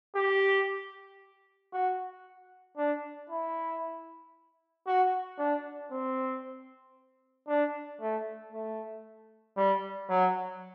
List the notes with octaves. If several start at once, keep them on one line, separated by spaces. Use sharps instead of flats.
G4
F#4
D4
E4
F#4
D4
C4
D4
A3
A3
G3
F#3